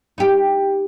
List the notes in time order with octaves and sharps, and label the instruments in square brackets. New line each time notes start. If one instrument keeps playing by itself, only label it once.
[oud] D#4 G4